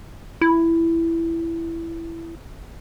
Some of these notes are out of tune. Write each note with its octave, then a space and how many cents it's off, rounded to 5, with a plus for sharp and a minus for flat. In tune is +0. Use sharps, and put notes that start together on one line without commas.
E4 +10